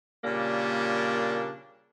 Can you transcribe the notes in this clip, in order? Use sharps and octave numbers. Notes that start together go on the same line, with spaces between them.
A#2 C#3 G3 A#3 D4